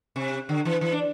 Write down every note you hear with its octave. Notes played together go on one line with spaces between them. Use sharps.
C3
D3
E3
E3
D4